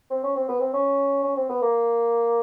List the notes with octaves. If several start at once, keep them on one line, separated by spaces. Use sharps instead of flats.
C4
C#4
C4
B3
C4
C#4
C#4
C4
B3
A#3